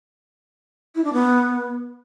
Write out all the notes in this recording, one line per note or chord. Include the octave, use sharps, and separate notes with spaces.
E4
D4
B3